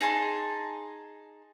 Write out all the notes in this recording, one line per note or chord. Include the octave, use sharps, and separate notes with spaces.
D#4 G#4 A5 C6